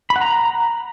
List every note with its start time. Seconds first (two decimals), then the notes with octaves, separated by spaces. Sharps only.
0.10 B5
0.16 F#5
0.21 A#5